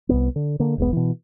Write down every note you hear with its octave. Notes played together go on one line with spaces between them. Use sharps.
C2 F#2 B3
D3
D3 A#3
E1 B1 G#3 B3
B2 E3